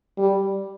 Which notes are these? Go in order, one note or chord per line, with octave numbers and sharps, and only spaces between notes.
G3